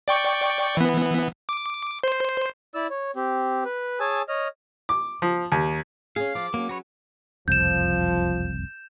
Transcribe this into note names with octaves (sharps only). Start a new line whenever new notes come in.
D5 G5 C#6
E3 B3
D6
C5
E4 D5 E6
C#5
C4 G4
B4
G#4 C#5 G#5 A5 E6
C#5 D#5 F6
D6
F3
D#2
C#4 G#4 F5
F3 D6
F#3 A#3 C#4
F#4 B4 C#5
F#1 C2 F2 F3 G6 E7